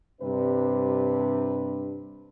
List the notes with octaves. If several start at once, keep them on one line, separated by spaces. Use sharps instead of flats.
G2 C3 D4 B4